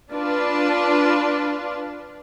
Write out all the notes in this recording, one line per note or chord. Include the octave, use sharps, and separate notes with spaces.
D4 F4 B4 D5